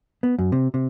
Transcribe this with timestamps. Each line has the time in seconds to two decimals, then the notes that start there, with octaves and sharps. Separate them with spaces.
0.23 B3
0.38 F#2
0.52 C3
0.74 C3